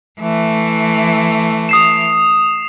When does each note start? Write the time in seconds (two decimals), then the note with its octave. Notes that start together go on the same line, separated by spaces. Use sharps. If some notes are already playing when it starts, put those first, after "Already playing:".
0.21 E3 A3
1.69 D#6 C7 E7